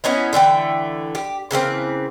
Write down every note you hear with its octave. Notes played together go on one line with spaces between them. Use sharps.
B3 C#4 D#4 E4
D3 E3 A3 G5
G4
C#3 E3 A#3 C4